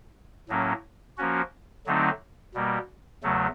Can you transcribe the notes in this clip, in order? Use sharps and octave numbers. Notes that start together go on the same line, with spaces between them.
A2 F#3 A#3 C#4
F3 A#3 C#4 F#4
D3 F#3 A3 C4 D#4
B2 G3 A#3
E2 C#3 F#3 A3